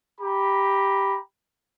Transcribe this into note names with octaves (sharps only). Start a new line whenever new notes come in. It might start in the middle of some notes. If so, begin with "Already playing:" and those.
G4 A#5 B5